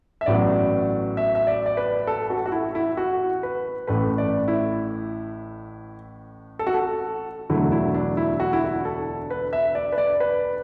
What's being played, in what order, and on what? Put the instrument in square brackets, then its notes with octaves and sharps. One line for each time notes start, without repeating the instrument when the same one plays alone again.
[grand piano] E5
A1 A2 F#3 B3 D5
E5
E5
D5
D5
B4
A4
F#4
A4
F#4
E4
E4
F#4
B4
A1 A2 A3 B4
D5
E4
A4
F#4
A4
E1 D2 D3 F#3 A3 E4
E4
D4
E4
F#4
E4
F#4
A4
B4
E5
D5
B4
D5
B4